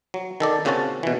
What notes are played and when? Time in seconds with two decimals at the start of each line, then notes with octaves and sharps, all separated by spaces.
0.14 F#3
0.40 D#3 A4 D5
0.65 A#2 C#3 C4 C#4 F#4 A5
1.03 B2 E3